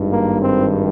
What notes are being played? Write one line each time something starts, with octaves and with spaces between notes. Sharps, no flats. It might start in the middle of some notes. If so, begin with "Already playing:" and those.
Already playing: G#1 G2 D#3
A#3
C4